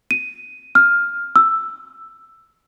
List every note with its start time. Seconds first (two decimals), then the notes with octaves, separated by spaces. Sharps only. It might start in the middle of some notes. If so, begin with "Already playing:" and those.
0.11 D#7
0.75 F6
1.36 E6